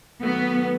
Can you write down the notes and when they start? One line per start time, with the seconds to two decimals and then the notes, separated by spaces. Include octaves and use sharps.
0.22 D#3 F#3 A3 B3